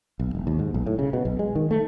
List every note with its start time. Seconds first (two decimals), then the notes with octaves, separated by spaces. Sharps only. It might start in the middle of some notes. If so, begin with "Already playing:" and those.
0.20 B1
0.35 E1
0.47 D#2
0.59 G#2
0.74 B1
0.86 A2
0.99 C#3
1.13 B2
1.25 B1
1.39 G#3
1.56 D#3
1.71 A3